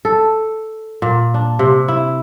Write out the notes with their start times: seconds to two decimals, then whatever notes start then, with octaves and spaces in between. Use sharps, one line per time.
0.05 A4
1.02 A#2
1.34 D4
1.59 C3
1.88 E4